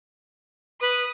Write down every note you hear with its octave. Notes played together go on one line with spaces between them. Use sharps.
B4 D#6